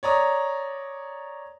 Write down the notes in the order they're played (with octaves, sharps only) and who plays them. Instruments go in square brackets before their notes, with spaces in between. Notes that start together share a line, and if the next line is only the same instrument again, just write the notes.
[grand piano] C#5 D5 A#5 D#6